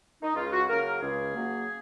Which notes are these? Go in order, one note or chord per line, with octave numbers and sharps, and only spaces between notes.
D#4
C#2 F4
F#4
C#3 F#3 A#3 A#4
A#4
C#2 G#4
C#3 F#3 A#3